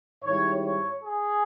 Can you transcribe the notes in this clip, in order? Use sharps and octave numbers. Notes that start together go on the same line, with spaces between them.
G#2 D#3 G3 C4 E4 C#5
C#5
G#4